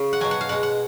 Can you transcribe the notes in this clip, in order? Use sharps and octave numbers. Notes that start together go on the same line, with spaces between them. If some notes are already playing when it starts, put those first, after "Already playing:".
Already playing: C#3
F#5
B2 F#3 G#5
F#5
F5
B2 G#3 F#5
F#5